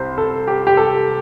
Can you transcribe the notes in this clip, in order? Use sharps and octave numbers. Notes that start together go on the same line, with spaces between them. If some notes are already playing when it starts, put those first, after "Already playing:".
Already playing: C2 C5
A4
G4
G4
A4